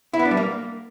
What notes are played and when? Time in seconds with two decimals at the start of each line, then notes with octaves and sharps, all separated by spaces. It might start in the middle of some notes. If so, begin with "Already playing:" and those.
0.13 E4
0.19 B3
0.25 D4
0.31 G3
0.37 A#3